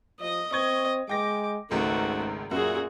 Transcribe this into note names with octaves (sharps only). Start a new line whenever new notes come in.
F3 D#5 D#6
C4 D#5 C#6 G#6
G#3 G5 D6 A#6
G#1 C#2 G#2 G#3 A3 F#4
F#2 A#2 F#4 G#4